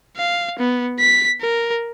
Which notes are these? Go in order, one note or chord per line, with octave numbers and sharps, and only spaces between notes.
F5
B3
B6
A#4